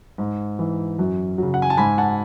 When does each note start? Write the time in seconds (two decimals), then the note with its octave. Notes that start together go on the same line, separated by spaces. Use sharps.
0.18 G#2
0.59 E3
0.99 F#2
1.38 C#3 F#3
1.54 F#5
1.62 G#5
1.70 A5
1.78 G#2 G#5 B5
1.98 F#5 A5